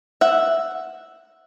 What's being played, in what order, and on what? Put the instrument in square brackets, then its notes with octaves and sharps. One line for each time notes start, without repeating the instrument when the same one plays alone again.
[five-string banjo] E5 F#5